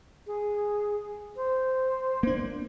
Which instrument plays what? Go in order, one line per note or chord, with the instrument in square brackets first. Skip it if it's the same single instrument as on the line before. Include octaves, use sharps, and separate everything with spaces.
[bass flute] G#4
C5
[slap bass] A#3 D4